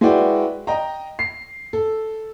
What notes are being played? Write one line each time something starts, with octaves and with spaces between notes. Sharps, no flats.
G#3 E4 F#4 B4 D5 G5
D#5 G5 A#5
C7
A4